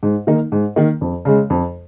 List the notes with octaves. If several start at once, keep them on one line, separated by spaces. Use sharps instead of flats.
G#2
D#3 A#3 D#4
G#2
D#3 A#3 D#4
F2
C#3 G#3
F2